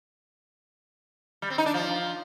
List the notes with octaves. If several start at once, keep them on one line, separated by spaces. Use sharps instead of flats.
G3
C4
D#4
D4
F3